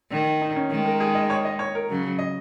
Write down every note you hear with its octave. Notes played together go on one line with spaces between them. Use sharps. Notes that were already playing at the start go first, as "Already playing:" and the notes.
D#3
D#4
C#4
D#3 G#3
A#4
G#4
D#5
C#5
D#5
C#5
A#4
C#3 F#3
D#5